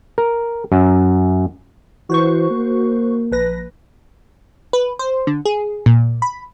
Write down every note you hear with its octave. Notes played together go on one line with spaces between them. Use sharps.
A#4
F#2
E3 F#4 C5 C#6
A#3
A#1 B4 A#6
B4
C5
D3
G#4
A#2
B5